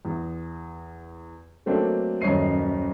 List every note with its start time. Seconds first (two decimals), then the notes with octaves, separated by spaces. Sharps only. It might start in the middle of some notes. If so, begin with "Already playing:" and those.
0.05 E2
1.66 D3 F#3 A3 A#3 C4 D4
2.21 D#1 F#2 C#5 D#5 C7 D#7